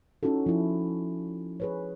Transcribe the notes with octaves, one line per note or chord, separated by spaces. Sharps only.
C#4 D#4 E4 F#4 A4
F3 E4
G#4 B4 C#5